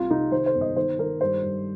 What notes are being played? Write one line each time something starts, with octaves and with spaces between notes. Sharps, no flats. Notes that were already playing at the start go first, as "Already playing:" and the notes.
Already playing: C2 F4
C3 D#4
D#3 C5
C5
G1
D#5
D#3 C5
D#3 A#4
G2 C5
G2